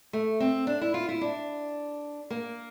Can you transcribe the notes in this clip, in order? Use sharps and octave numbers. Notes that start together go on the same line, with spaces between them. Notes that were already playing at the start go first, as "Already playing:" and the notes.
A3
C4
D4
E4
F4
E4
D4
A#3